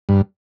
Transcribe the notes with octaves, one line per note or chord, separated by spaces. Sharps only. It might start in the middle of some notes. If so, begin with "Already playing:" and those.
G2